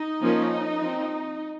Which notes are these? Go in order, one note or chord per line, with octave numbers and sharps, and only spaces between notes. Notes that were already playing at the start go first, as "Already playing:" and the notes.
Already playing: D#4
F3 A#3 C#4
F3 C4